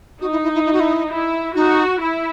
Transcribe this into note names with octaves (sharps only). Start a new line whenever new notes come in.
D#4 F#4
E4
E4
E4
E4
F#4
E4
E4
D#4 F#4
E4